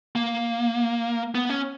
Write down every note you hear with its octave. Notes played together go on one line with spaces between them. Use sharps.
A#3
B3
C#4